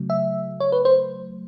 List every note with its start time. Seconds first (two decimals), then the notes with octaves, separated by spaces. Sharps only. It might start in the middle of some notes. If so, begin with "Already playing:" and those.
Already playing: C#3 F#3 A3
0.10 E5
0.60 C#5
0.72 B4
0.85 C5